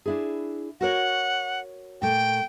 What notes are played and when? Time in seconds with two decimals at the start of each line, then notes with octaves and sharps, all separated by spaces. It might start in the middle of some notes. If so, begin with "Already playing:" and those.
0.06 D4 E4 G#4
0.81 F#4 A#4 C#5 F#5
2.02 A#2 A3 G5